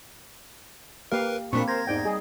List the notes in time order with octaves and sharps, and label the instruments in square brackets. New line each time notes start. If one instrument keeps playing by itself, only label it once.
[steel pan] A#3 G4 F5 [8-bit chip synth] A#4 B4
[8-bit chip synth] A#2 D4 B6 [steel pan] A#3 C4 [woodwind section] B5 C#6
[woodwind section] A#4 C5 [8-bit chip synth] G#6 A#6
[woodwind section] E2 G#2 [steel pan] D#4 D5 G5
[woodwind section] G3 D#5 [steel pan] G#4